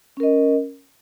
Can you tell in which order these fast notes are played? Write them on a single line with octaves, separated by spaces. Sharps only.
C#4 A#4 D#5